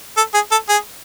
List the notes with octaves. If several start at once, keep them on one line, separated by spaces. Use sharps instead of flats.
A4
G#4
A4
G#4